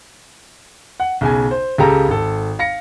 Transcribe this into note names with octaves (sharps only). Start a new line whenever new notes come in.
F#5
B1 C#3 G#5
C5
C#2 C#3 G4 A4 A#5
G#1 A4
F5 A#6 C#7